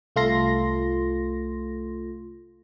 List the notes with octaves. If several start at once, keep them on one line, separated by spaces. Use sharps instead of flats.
C2 A3 F4 A4 C6 A#6